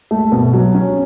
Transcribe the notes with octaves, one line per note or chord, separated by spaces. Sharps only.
A3
B2
F#3
C#4